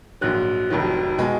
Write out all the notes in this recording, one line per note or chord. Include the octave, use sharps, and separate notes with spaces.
A#1 G#2 F#3 F#6
F1 F2 D#3 F#3
B2 G#3